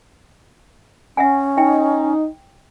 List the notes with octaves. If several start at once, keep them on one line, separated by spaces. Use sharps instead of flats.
C#4 E5 F#5 G#5
D#4 E5 G5